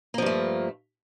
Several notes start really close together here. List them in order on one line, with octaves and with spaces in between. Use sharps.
A#3 F3 G2 A3